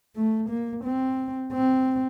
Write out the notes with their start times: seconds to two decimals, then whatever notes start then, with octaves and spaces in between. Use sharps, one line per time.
0.16 A3
0.50 A#3
0.85 C4
1.53 C4